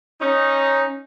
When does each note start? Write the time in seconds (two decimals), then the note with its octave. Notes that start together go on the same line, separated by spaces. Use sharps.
0.21 C#4 D#4